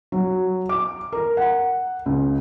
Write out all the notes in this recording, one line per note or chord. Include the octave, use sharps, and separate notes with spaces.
F#3
D6
A#4
F#5
C#2